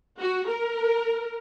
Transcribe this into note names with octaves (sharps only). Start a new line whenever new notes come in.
F#4
A#4